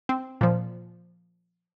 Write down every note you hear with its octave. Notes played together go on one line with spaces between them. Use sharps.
C4
A#2 F3